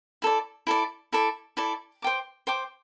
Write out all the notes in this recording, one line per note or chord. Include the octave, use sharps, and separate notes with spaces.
E4 A4 D5
E4 A4 D5
E4 A4 D5
E4 A4 D5
C5 G5 D6
C5 G5 D6